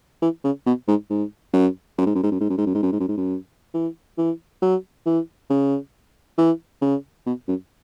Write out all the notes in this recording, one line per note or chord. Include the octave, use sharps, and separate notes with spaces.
E3
C#3
B2
G#2
G#2
F#2
F#2
G#2
F#2
G#2
F#2
G#2
F#2
G#2
F#2
G#2
F#2
G#2
F#2
G#2
F#2
E3
E3
F#3
E3
C#3
E3
C#3
B2
F#2